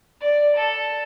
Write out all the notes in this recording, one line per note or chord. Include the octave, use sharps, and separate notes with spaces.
D5
A4